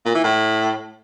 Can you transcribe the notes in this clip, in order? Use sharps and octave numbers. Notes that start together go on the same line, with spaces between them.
A#2
E3
A2